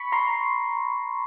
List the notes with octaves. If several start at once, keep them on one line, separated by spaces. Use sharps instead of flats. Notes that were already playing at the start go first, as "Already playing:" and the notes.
Already playing: B5 C#6
A#5 C6